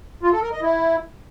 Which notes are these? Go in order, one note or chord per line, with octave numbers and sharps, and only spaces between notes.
F4
A4
A#4
D#5
E4